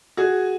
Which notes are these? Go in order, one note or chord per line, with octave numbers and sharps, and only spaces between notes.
F#4 G#4